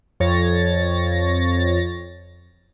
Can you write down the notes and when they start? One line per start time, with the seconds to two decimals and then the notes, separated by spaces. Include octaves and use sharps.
0.20 F2 C#5 A6 A#6